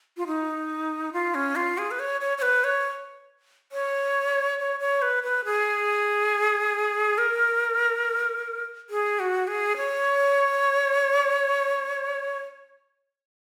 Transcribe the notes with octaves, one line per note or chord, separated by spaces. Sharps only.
F4
D#4
F4
C#4
F4
G#4
B4
C#5
C#5
C#5
B4
C#5
C#5
C#5
C#5
B4
B4
G#4
A#4
G#4
F#4
G#4
C#5